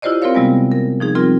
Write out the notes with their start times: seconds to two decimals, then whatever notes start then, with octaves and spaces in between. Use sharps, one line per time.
0.02 E4 F4 G4 C5 D5 D#5
0.22 C4 F4 A#4 C5 C#5 F5
0.35 C3 G3 G#3 B3
0.72 A#4
1.00 F3 D#4 G#4
1.15 G3 C4 F4 A#4